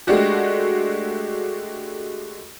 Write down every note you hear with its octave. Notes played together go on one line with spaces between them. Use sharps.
G#3 A3 D4 F#4 G4